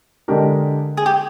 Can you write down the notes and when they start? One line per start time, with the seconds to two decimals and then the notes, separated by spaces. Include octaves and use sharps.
0.28 D3 G#3 D4 G4 A#4
0.97 G#4
1.06 G4